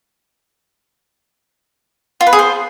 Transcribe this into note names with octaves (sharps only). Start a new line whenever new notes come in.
F4
B4
G#4
C5